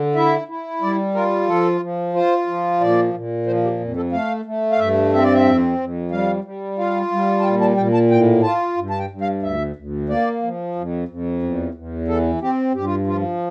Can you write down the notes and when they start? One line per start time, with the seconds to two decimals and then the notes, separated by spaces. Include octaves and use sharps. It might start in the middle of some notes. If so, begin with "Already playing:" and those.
Already playing: D3
0.15 E4 E5
0.48 E4
0.81 G3 D5
1.14 F4 A#4
1.48 F3 A4
1.81 F3
2.13 F4 C5
2.47 F3
2.81 A#2 D5
3.14 A#2
3.46 F3 C5
3.64 G4
3.80 F2
3.96 A4
4.12 A3 F5
4.45 A3
4.72 F5
4.79 G2 E5
5.12 C4 E5
5.23 D5
5.33 E5
5.45 F2
5.78 F2
6.11 G3 F5
6.44 G3
6.78 F4 F5
7.11 G3
7.40 A5
7.43 A#2 G5
7.61 A5
7.77 A#2 G5
7.94 A5
8.10 A2 G5
8.43 F4 A5
8.77 G2
8.90 A5
8.99 G5
9.10 G2
9.21 F5
9.42 D2 E5
9.76 D2
10.09 A#3 D5
10.43 F3
10.75 F2
11.08 F2
11.42 E2
11.74 E2
12.08 E3 A4
12.41 C4 G4
12.74 G2 G4
12.85 F4
13.07 F3 F4